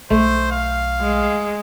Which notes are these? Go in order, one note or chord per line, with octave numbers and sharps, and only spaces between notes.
B1 A3 C5
F5
G#3